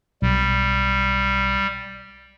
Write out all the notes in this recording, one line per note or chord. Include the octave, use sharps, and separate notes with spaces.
B1 G3